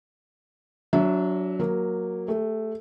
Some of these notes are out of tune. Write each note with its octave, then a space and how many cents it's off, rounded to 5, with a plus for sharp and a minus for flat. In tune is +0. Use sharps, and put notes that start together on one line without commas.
F#3 +0 D4 -30 E5 +0
F#3 -10 A#3 +0
A3 +0 G4 +40